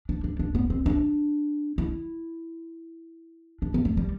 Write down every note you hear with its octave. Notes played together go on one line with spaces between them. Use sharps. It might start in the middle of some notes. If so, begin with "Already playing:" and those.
D4
D4
D4
B3
C4
D4
E4
D4
B3
A3
G3